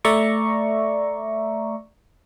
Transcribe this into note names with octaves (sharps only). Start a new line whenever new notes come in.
A3 D5 E5 A#5 C#6